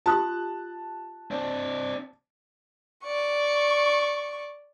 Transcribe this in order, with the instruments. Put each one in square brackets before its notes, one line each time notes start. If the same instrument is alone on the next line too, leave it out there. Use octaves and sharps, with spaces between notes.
[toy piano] F4 G4 D#6 [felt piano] A5 F#6
[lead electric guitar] C4 D4
[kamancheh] D5 C#6